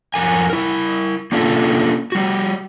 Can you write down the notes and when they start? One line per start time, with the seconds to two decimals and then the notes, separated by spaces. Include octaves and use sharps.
0.14 F2 A#4 G#5
0.50 E4 A#4
1.32 A#3 C#4 D4 F4 A4
2.12 G3 F#4